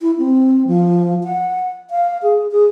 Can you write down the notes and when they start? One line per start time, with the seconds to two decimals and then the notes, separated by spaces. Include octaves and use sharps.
0.01 E4
0.18 C4
0.67 F3
1.24 F#5
1.91 F5
2.23 G#4
2.51 G#4